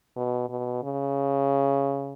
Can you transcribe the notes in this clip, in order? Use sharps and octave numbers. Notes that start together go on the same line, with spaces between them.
B2
B2
C#3